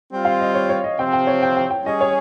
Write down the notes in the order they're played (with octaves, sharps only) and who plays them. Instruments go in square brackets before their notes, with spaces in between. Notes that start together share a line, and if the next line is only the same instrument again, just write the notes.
[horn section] G3 C4 F4
[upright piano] F5
D#5
C#5
C#5
D#5
[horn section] C3 F3 C4 [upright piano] G5
[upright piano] G5
C#5
G5
G5
G5
[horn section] G3 C#4 G#4 [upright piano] D#5
[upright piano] C#5